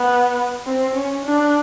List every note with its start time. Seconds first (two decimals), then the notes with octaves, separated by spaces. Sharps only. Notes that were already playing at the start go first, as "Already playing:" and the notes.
Already playing: B3
0.66 C4
0.95 C#4
1.24 D4